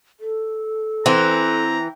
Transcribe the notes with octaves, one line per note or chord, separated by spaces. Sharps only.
A4
E3 C4 A#5